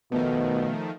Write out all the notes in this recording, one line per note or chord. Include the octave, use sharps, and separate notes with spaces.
B2 D#3 F3 A3 B3